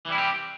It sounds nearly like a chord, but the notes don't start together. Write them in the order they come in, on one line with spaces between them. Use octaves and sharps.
E3 G3 E4 C4 G4